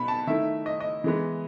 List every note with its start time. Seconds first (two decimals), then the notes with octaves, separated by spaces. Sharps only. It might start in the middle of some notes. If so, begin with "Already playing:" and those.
Already playing: B2 B3 B5
0.08 A5
0.27 D#3 A3 E4 E5
0.66 D#5
0.80 D#5
1.04 E3 G#3 B3